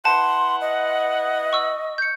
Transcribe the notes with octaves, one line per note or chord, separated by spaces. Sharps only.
E4 B4 F#5 A5 C6
D#5
C#6 E6
G6 C#7